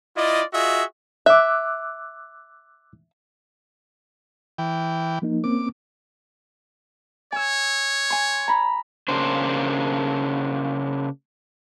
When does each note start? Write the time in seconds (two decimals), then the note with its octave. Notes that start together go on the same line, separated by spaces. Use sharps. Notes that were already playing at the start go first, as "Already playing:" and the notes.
0.17 E4 F4 D5 D#5
0.53 F4 F#4 G#4 D#5 E5
1.26 E5 D6 E6 F#6
4.58 E3 G5
5.22 F3 A#3 D#4
5.44 A#3 C4 C#4 D6
7.32 C#5 G#5 E6
8.10 G#5 C6
8.48 A#5 B5
9.08 C#3 A#3 D4 C5